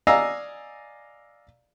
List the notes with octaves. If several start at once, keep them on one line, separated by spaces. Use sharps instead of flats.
D5 D#5 F5 G#5 A#5 E6